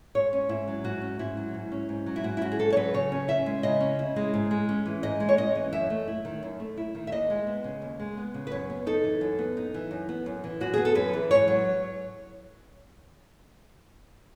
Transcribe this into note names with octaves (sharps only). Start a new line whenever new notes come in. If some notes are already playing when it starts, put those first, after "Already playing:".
G#2 C#5
C#4
G#2 E4
F#3
G#2 F#4
C#4
G#2 E4
F#3
G#2
C#4
G#2
F#3
E4
G#2 F#4
E4
C#4 F#4
G#4
G#2 A4
C#5
F#3 B4
C#3 C#5
C#4
E4 E5
G#3
C#3 D#5
C#4
E4
G#3
G#2
G#3
C#4
E3
G#2 D#5
G#3
C#5
C#4 D#5
E3
F#2 E5
A3
E4
D#3
F#2
A3
E4
D#3
E5
D#2 D#5
G#3
B3
C#3
D#2
G#3
B3
C#3
B4
F#2 C#5
B3
D#4 A4
E3
F#2
B3
D#4
E3
F#2
B3
F#2
E3
F#2 F#4
B3 G#4
A4
F#2 B4
E3
G#2 C#5
F#3